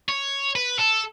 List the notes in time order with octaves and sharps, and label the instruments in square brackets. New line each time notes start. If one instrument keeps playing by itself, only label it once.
[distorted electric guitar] C#5
B4
A4